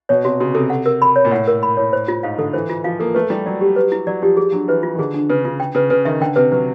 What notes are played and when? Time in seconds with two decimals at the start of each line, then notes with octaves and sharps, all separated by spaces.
0.09 B2 C#5
0.24 C3 F#4
0.41 C#3 F#4
0.55 C3 A4
0.70 F#5
0.86 A#4
1.02 B5
1.16 C#5
1.25 A#2
1.31 A2 F#5
1.48 A#4
1.63 B5
1.77 A2 C#5
1.93 C5
2.08 F4
2.23 G#2 F5
2.38 D3 A4
2.53 E3 C5
2.70 F4
2.84 F3 F5
3.00 A#3 A4
3.15 A3 B4
3.30 G3 E4
3.46 F#3 D5
3.61 G4
3.76 B4
3.92 E4
4.07 F#3 D5
4.22 F3 G4
4.37 F3 G#4
4.52 F#3 D4
4.68 E3 B4
4.83 F4
4.95 D#3
4.99 D3 G#4
5.14 D4
5.30 C#3 B4
5.45 C#3 F4
5.60 G5
5.75 C#3 B4
5.90 C#3 B4
6.05 D#3 E5
6.21 D3 G5
6.36 C3 B4
6.52 F#3 B4